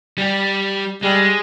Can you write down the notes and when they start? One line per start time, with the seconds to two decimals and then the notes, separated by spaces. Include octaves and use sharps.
0.18 G3 G4
1.03 G3 G#3